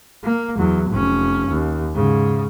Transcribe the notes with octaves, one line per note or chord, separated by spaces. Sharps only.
A#3
E2 F#3
F1 C#4
D#2
G#2 C#3